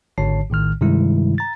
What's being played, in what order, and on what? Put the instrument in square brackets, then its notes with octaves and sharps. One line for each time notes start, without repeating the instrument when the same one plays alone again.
[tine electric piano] G#1 G#2 D3 C#5 A5 C7
A#1 A2 D#3 F6
G2 C3 D#3 G3 G#3 E4
A#5 A6